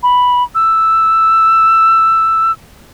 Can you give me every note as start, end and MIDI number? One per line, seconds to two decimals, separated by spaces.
0.03 0.43 83
0.55 2.52 88